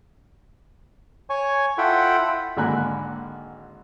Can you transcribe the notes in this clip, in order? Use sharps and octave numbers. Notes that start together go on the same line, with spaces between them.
C#5 G#5 C#6
E4 F4 A4 F#5 G5 B5
G#1 D3 A#3 G#5 B5 F#6